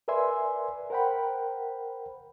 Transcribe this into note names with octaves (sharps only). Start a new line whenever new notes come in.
A#4 B4 D5 E5 G#5 C6
A#4 C5 F#5 G5 B5